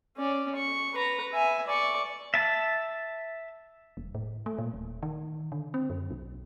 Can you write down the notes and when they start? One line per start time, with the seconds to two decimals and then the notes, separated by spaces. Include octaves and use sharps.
0.17 C#4 D5
0.55 C#6
0.94 B4 A#5
1.33 E5 G#5
1.67 D5 C#6
2.34 E5 A5
3.97 E1
4.15 A2
4.46 A3
4.58 A#2
4.73 D#1
5.03 D#3
5.52 D3
5.74 C4
5.90 F#2
6.10 B1